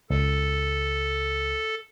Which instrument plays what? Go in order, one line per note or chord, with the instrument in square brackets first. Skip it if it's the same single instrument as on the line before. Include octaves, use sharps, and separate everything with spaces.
[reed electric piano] C#2 [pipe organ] A4